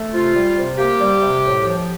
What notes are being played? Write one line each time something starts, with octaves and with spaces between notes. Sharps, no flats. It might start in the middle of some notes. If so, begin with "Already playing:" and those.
Already playing: A3
C3 F4
G3
C3
A#3 G4
G3
C3
A2
F3